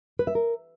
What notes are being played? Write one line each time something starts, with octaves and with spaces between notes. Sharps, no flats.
B4
E5
A#4